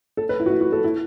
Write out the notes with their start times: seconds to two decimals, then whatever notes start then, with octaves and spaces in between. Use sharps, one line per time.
0.17 A4
0.29 B4
0.40 E4
0.46 F#4
0.50 E4
0.61 F#4
0.72 A4
0.84 E4